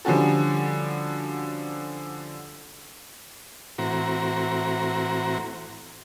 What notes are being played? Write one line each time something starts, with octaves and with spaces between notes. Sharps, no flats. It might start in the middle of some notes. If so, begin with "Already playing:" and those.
D3 F3 G3 C#4 F#4 A4
A2 E3 C4 F#4 A#5